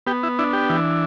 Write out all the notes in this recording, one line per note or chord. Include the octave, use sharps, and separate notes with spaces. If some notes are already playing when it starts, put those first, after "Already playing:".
B3 G4
E4
D4 E4
G4
E3